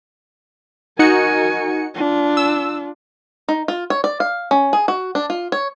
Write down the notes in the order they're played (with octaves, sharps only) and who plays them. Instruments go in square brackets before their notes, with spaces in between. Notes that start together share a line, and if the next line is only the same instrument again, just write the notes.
[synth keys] D#4 F#4 C#7 [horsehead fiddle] A#4 G#5
[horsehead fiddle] D4 F4
[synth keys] E6
[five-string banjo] D#4
F4
C#5
D5
F5
C#4
G#4
F#4
D4
F4
C#5